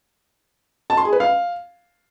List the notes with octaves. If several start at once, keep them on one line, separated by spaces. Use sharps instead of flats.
A5
C6
G#4
B4
F5